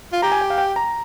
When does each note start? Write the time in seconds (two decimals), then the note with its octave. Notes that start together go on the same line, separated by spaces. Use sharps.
0.13 F4
0.22 G4 A#5
0.32 G#5
0.41 G5
0.50 F5
0.58 G5
0.76 A#5